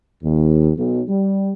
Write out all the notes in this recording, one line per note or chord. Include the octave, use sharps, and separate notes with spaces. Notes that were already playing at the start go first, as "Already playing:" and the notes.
D#2
B1
G3